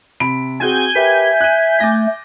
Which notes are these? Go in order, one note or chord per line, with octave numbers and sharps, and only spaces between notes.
C3 B5 D7
C4 F#4 G#4 G#5 G6
G4 A#4 B4 E5
F#6 D#7
A3 D6 A6 A#6